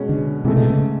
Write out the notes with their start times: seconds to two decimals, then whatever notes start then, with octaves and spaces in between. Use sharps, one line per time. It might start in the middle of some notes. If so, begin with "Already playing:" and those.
Already playing: B2 G#3 C#4
0.09 D3
0.45 G#2 C3 E3 A3
0.57 B2
0.70 C#3